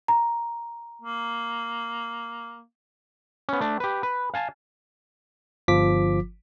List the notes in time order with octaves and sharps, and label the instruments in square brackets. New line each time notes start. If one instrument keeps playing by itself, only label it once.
[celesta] A#5
[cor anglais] A#3
[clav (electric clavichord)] B3 C#4
A3 D4
G4 B4
B4
F5 G#5 A5
[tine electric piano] G1 F3 F4 D6 B6